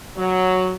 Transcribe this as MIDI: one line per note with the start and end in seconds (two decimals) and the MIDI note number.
0.17 0.73 54